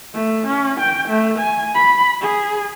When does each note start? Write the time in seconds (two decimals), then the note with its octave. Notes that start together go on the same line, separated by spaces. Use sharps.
0.14 A3
0.46 C#4
0.80 G5
1.09 A3
1.38 G#5
1.74 B5
2.21 G#4